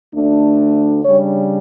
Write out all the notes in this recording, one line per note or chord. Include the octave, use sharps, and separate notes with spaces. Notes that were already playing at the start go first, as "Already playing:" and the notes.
D2 D3 A3 D4
C#3 G3 D4 C#5